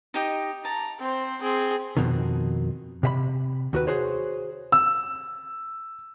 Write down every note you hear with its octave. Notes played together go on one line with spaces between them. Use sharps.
D#4 G4 D#5
A5 A#5
C4 C5
C4 G#4
F2 B2 D#3
C3 E5 B5
D#2 F#4 B4
F#4 G#4 C5 C#5
E6